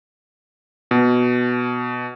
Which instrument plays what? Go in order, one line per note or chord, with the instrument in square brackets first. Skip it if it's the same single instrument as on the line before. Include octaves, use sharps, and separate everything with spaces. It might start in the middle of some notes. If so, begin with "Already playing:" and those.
[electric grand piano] B2